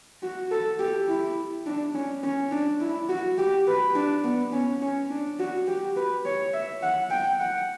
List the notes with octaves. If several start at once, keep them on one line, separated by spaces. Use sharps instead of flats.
F#4
A4
G4
E4
D4
C#4
C#4
D4
E4
F#4
G4
B4
D4
B3
C#4
C#4
D4
F#4
G4
B4
C#5
E5
F#5
G5
F#5